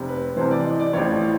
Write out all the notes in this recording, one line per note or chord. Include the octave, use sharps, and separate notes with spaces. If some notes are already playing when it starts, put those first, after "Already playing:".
Already playing: F1 C3
B4
C2 C3 E3 C5
D5
D#5
D5
A1 A2 F3 C#5